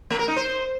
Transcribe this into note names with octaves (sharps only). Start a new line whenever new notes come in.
A3
A#4
D#4
C5